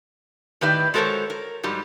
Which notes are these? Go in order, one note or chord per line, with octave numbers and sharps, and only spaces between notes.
A2 D#3 G4 B4 D5 E5
G#3 F#4 A4 A#4 C5 C#5
A#4
G#2 F#3 G3